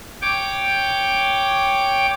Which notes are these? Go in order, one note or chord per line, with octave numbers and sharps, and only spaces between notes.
C#5 G5 D6